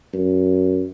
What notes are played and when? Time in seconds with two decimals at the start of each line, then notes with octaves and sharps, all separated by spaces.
0.13 F#2